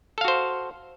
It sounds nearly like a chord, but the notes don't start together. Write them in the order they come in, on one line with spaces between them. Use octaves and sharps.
A4 F5 F#4 C5